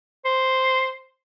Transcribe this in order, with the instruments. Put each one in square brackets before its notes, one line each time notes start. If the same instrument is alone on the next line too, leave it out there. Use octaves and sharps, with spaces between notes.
[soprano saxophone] C5